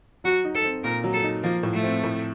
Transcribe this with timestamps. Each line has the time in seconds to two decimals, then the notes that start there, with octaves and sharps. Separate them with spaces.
0.24 F#3 F#4
0.44 D#4
0.55 A4
0.64 C4
0.84 A#2 A#4
1.04 F#3
1.13 A4
1.23 D#4
1.44 F3 A#3
1.63 A2
1.74 A3
1.83 C4
2.04 A2